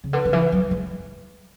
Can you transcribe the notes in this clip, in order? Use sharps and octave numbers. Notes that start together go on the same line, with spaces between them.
C#3
D3 B4
D3
E3
F#3
G#3